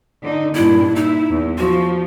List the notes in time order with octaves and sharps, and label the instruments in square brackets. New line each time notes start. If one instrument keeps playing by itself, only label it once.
[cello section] D3 D#4
[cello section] G2 A#2 D4 [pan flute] E4
[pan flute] D#4 [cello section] E4
[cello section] E2
[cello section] F3 [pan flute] F#4